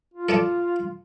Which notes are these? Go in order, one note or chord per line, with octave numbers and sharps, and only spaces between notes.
F4
A4 D5 A5